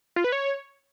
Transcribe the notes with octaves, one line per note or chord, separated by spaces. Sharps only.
F4
B4
C#5